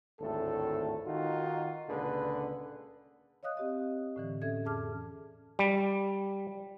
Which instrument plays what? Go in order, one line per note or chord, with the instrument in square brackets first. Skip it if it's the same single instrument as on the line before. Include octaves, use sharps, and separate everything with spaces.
[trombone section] G#1 D2 A2 A4
D#3 D#4 F4 F#4
C#2 A#2 D3 G#4 B4
[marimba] C#5 D#5 F5 D#6 F#6
C4 G4 D#5
A2 D3 E3
C#4 A4 E5 G#6
F2 G#4 A5 D6 F6
[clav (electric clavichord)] G3